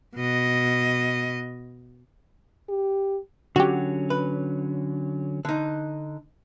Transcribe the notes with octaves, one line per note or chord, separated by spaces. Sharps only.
B2 D#5
G4
D3 F#3 C#4 F#4 G4
B4
D3 D#4